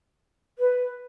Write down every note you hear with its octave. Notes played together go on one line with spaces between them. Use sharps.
B4